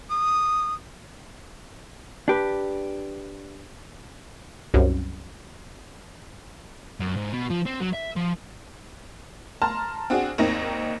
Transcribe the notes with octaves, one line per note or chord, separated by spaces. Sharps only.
D#6
D4 G4 B4
C2 F#2
F#2
G#2
B2
F3
C4
F#3
E5
F3
A5 A#5 C6 F6
C4 D4 F#4 G#4
G#1 D#2 C4 D#4 A#6